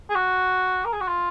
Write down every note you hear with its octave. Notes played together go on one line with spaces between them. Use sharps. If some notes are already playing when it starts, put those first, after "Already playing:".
G#4
F#4
A#4
G#4
F#4
F4